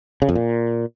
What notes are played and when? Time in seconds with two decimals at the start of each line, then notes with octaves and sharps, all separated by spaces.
0.22 C#3
0.29 F2
0.35 A#2